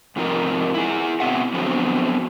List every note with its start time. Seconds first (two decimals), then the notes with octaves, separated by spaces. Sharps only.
0.16 G#2 C3 F3 D#4 A#4
0.74 E4 G#4
1.20 B2 C4 E5 F#5
1.54 F2 D3 F3 F#3 B3 C4